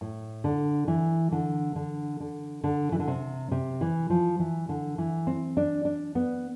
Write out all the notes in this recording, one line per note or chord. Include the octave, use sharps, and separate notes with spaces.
A2
D3
E3
D3
D3
D3
D3
E3
D3
C3
C3
E3
F3
E3
D3
E3
C4
D4
D4
B3